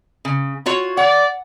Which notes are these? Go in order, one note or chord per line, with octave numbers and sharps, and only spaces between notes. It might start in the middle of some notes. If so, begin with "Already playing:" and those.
C#3
F4 F#4 C#5
D5 F#5